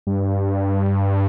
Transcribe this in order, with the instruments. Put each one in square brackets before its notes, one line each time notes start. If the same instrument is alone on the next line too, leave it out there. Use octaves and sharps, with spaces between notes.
[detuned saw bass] G2